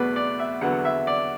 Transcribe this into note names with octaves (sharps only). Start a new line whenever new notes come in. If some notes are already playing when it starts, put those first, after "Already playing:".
Already playing: E2 B2 A3 B4 D5
D5
E5
E2 D3 F#3 B3 F#5
E5
D5